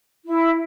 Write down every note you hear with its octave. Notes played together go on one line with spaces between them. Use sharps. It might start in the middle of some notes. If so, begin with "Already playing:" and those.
E4